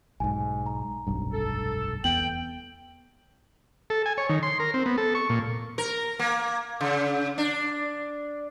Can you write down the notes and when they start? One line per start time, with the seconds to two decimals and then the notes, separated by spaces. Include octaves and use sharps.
0.20 B1 G#2 G#5
0.66 A#5
1.07 F1 B1 G2
1.32 A4
2.04 E2 B3 G5 F#7
3.90 A4
4.06 G#5
4.18 C#5
4.30 D#3
4.43 C6
4.60 A#4
4.74 C4
4.86 B3
4.98 A4
5.15 C#6
5.30 A#2
5.78 A#4
6.19 A#3
6.81 C#3
7.38 D4